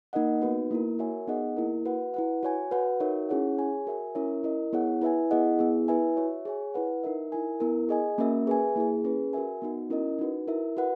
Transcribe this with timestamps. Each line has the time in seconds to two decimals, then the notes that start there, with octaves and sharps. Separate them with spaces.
0.13 A#3 D#4 A#4 D#5 F#5
0.42 B3 D#4 F#4 B4
0.71 A#3 E4 A#4
0.99 F#4 A#4 C#5 E5 G#5
1.27 B3 D#4 G#4 D#5 F#5
1.57 A#3 E4 A#4
1.85 F#4 B4 F#5
2.14 E4 B4 F#5
2.43 F#4 C#5 G#5
2.71 F#4 B4 F#5
3.00 D#4 F#4 A#4 C#5 E5
3.29 C#4 E4 G#4 C#5 F#5
3.58 G#4 C#5 G#5
3.87 F#4 A#4 E5 G#5
4.15 C#4 E4 A#4 C#5 E5
4.44 E4 A#4 D#5
4.73 B3 E4 G#4 C#5 F#5
5.02 E4 B4 E5 G#5
5.31 B3 E4 G#4 D#5 F#5
5.59 B3 E4 G#4
5.88 E4 B4 E5 G#5
6.17 F#4 C#5 E5
6.45 G#4 C#5 G#5
6.74 E4 B4 F#5
7.04 D#4 A#4 E5
7.32 E4 A#4 E5 G#5
7.60 B3 E4 A#4
7.89 G#4 D#5 G#5
8.18 A#3 C#4 F#4 A#4 E5
8.47 G#4 B4 E5 G#5
8.76 A#3 E4 G#4
9.04 C#4 G#4 B4
9.33 F#4 A#4 E5 G#5
9.62 B3 D#4 F#4
9.90 C#4 E4 A#4 D#5
10.19 D#4 F#4 B4
10.48 E4 A#4 E5
10.77 F#4 B4 F#5